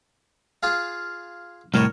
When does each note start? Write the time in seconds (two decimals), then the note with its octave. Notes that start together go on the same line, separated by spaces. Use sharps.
0.63 F4 G#4 F5
1.74 C2 A2 A#4 C#5